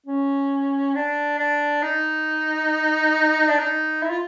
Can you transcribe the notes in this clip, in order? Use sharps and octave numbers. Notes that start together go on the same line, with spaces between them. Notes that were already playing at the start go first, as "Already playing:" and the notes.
C#4
D4
D4
D#4
D4
D#4
E4
F4